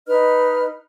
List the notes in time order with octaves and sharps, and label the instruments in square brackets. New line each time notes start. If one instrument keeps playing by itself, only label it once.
[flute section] D#4 B4 D#5 F6